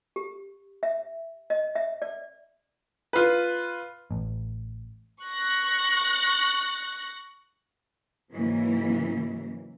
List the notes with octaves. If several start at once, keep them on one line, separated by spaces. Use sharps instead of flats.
G4
E5
D#5
E5
D5
F4 B4
A1
C#6 F#6 A#6
G#2 C#3 E3 F#3 A#3